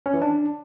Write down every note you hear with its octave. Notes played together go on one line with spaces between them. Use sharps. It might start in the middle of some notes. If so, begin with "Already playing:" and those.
C#4
E3
D4